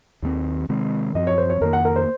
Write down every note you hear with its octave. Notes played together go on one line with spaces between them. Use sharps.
D#2 D#3 G#3 C4
C3 D#3 G#3 C4
F#2 F3 C4 D#5
C#5
C5
C#5
F2 D#3 A#3 A#4
F#5
A#4
C5